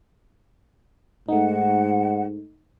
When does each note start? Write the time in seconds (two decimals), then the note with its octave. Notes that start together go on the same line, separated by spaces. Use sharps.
1.28 G#2 A3 D#4 F#5